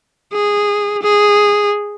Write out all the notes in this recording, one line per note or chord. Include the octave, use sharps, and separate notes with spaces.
G#4
G#4